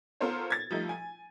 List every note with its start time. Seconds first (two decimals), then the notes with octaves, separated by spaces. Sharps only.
0.20 B3 F4 A4 A#4 C5 C#5
0.50 G#6 A6
0.71 F3 G3 A3 D#4
0.89 G#5